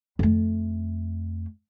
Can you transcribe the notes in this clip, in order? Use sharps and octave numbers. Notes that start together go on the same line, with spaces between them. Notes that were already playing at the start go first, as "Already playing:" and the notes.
F2 A3